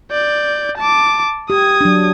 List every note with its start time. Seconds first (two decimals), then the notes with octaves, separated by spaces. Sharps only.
0.12 D5 G6
0.78 A5 D6
1.50 G4 D#6 G#6
1.81 F#3 D4